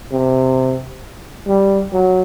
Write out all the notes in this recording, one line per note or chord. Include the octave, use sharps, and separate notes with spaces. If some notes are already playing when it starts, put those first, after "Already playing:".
C3
G3
F#3